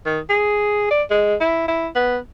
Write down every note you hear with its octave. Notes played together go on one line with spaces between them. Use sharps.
D#3
G#4
D5
G#3
E4
E4
B3